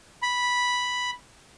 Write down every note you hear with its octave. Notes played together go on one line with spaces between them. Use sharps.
B5